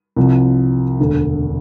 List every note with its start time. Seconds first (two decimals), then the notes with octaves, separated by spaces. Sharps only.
0.16 C2 C3 F3
0.99 E1 D2 D3